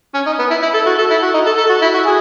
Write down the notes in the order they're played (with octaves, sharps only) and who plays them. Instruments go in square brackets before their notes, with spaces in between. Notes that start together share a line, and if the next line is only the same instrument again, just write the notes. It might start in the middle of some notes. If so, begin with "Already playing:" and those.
[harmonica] C#4
D#4
B3
E4
E4
A4
F#4
A4
E4
F#4
D#4
A4
A4
F#4
E4
F#4
G#4